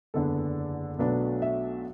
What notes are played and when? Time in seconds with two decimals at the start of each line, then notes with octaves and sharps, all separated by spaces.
0.14 F#1 E2 D3 B3 D4 A4
0.99 B1 B2 F#3 A3 D4 B4
1.42 E5